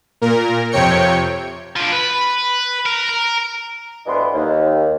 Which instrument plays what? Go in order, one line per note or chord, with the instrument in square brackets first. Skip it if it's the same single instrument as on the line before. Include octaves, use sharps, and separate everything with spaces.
[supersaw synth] A#2 A#4
F2 C3 C#5 G5 C#7
[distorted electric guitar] F3 D4
B4
A#4
A#4
[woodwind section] D2 G2 E3 B3 D#5 C6
D#2